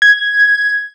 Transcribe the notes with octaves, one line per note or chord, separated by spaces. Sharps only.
G#6